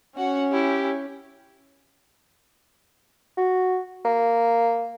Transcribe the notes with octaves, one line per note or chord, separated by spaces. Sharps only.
C#4 F#4 F#5
E4 G4
F#4
A#3